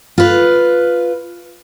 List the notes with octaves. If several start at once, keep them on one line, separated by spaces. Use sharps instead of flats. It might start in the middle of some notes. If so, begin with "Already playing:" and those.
F4 B4